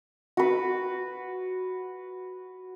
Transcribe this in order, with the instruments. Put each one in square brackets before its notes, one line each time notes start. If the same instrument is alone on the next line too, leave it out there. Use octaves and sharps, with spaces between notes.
[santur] F#4 B4